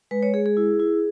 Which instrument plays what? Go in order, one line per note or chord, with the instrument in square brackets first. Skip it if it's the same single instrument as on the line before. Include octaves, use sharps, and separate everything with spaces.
[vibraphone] G#3 B4
C#5
G#3 G#4
G#4
E4
E4